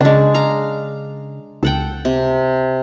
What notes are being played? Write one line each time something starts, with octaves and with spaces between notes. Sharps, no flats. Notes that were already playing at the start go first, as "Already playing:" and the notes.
C#3 G#3 D4
F5 A#5
C#2 A4 F#5 G5
C3